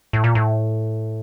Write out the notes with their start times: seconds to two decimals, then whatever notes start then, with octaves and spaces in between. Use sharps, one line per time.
0.13 A2
0.24 A#2
0.35 A2